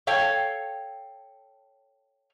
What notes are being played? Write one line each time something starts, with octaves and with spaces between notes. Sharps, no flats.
A4 C#5 F5 G5